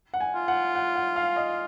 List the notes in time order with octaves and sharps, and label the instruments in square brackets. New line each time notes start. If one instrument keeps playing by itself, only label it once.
[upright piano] F#5
G#5
[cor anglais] F4
[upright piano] F#5
F#5
F#5
F5
D#5